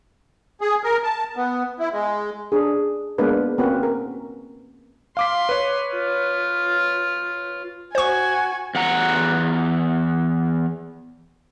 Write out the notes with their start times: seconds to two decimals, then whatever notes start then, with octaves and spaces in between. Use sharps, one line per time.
0.61 G#4
0.84 A#4
1.04 A5
1.36 B3
1.80 E4
1.92 G#3
2.52 D4 G#4
3.18 G#3 A#3 B3 D4 B4
3.58 A#3 C4 C#4 F#4 B4
3.83 A#4
5.17 F5 C6 D6 B6
5.49 B4 C#5
5.95 F4
7.95 F#4 C5 G#5 C#6
8.75 E2 F#5 A#5